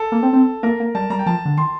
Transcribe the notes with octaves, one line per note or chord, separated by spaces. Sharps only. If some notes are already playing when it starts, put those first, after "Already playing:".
Already playing: A4
A#3
C4
C4
A#3 A#4
A#3
G3 A5
G3 A#5
G5
F3 A5
D3
D#3 C6